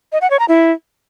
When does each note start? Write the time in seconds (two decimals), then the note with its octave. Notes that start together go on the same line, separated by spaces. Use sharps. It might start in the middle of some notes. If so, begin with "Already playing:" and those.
0.12 D#5
0.21 F#5
0.30 C#5
0.39 A#5
0.48 E4